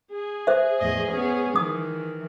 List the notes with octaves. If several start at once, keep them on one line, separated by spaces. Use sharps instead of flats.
G#4
C5 E5
E2 A2 D#5
B3 C#4
D#3 E3 D#6